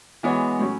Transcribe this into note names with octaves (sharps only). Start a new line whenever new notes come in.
E3 G#3 B3 F#4 C#5
A2 F#3 C#4